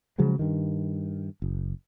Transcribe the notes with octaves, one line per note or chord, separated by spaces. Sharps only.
C#3 F3 F#3 G#3
G2 D#3
F#1